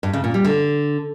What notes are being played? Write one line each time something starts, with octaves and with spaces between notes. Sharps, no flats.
G2
C#3
A#2
G3
D3